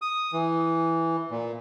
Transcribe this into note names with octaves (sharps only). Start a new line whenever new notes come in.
D#6
E3
A#2